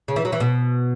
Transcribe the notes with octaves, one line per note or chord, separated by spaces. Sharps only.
C#3
E3
F#3
E3
B2